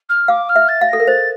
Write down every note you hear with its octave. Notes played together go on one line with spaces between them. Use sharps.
F6
F5 D6
F6
E5
A6
F5
A4 A#6
A#4
C5 A6